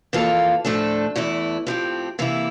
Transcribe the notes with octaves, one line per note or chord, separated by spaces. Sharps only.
F2 E3 A#3 F4 A4
A2 F3 A3 D4 A4
E2 E3 A3 E4
A2 F3 C4 G4
C3 E3 A#3 E4